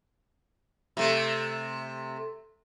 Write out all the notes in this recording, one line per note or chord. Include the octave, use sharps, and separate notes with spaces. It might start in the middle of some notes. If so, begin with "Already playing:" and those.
C3 A3